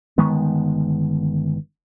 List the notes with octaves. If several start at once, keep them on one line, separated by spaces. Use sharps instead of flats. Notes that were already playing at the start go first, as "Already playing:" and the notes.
G1 D#3 G#3 B3